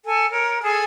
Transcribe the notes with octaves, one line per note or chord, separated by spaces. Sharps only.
A4 G#5
A#4 C#5
G#4 A4 G#5